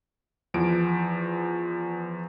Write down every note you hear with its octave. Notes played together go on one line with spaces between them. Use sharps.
E2 F3 D7